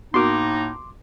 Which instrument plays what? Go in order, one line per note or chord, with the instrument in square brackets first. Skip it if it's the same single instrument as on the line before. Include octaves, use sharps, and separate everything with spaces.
[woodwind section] A2 A#3 D#4 [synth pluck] B3 F#4 A#4 [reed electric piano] C6 D6